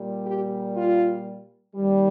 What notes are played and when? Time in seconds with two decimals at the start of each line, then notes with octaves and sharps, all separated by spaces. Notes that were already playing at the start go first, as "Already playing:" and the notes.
Already playing: A#2 G3
0.27 G4
0.77 F4
1.76 D#2 D#3 G3